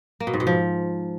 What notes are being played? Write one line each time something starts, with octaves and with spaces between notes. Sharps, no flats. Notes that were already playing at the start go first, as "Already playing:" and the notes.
A#3
B2
G#2
B2
F3